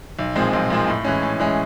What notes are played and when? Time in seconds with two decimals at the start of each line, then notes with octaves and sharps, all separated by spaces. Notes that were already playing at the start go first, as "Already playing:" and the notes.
0.19 B1
0.36 A#2 F3 G#3 C4
0.53 B1
0.70 A#2 F3 G#3 C4
0.88 A2
1.05 E3 G#3 C#4
1.22 A2
1.40 E3 G#3 C#4